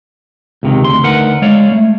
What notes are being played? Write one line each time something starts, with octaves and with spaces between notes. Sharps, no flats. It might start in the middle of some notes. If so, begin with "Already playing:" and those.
C#2 C3 D#3
D2 C6
D2 D#4 A#4 B4 F#5
G#3 C#5 D5 F5
A3